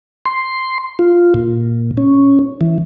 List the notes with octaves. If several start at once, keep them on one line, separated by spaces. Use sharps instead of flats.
C6
F4
A#2
C#4
E3